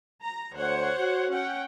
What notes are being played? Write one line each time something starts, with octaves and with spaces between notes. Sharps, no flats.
A#5
D2 C5 C#5 F#5
F#4
C#4 F#5 G5